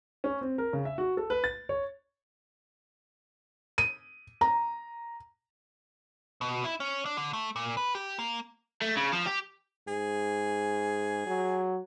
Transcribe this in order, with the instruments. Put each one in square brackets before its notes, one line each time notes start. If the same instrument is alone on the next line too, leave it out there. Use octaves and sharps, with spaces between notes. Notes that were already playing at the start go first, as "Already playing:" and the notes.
[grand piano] C#4
C4
A#4
C#3
E5
F#4
A4
B4
A6
C#5
[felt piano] D#7
A#5
[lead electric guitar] B2
E4
C#4
D4
D3
A3
A#2
B4
G4
A#3
[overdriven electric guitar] A3
C#3
F3
G4
[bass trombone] G#2 [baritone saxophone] G#4
[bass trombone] F#3